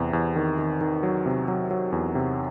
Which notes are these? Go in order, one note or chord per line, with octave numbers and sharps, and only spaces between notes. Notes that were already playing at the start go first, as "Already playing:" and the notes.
Already playing: E2 C3
E2
D#3
D#3
D#3
F#3
C3
F#3
F#3
E2
C3